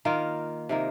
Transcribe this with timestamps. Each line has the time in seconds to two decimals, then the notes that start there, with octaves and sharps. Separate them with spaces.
0.05 D#3 A#3 F4
0.69 C3 D#3 A#3